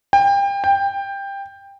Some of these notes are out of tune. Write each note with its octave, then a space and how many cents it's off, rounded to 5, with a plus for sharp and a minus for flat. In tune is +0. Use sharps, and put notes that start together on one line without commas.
G5 +30
G5 +15